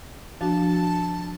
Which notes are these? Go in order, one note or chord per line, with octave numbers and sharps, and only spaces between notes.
F3 D4 F#4 A5